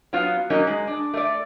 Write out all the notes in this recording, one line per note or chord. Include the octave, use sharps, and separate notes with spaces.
F#3 B3 F4
F#3 A#3 C#4 D#4
G#3
D4
A3 D5